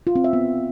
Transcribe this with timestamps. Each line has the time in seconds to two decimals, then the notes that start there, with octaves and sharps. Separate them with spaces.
0.07 F4
0.15 C4
0.24 E5
0.33 B3